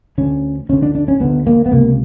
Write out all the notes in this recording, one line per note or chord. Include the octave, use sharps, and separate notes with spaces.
D2 D3 C#4
D2 D3 C#4
D4
D4
C#4
D2 D3 B3
A#3
B3
C#2 C3 A#3